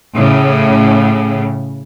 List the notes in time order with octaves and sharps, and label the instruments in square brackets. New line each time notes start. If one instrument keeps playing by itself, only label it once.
[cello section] A2 C#3